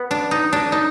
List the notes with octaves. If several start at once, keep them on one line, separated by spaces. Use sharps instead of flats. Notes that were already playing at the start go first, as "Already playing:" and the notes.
Already playing: B3
D4
D#4
D4
D#4